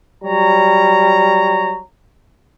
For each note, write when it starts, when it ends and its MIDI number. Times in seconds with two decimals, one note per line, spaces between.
0.24 1.80 54
0.24 1.80 55
0.24 1.80 73
0.24 1.80 82